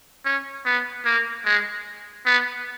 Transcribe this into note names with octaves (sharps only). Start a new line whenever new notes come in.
C#4
B3
A#3
G#3
B3